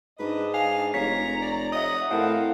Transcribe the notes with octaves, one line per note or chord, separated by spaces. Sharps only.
G#2 D4 B4 D#5
F5 G#5
F1 C#5 A#5 B6
D5
C#5 D#5 E5 F#5 D#6
A2 C4 A4 A#4 F5 F#5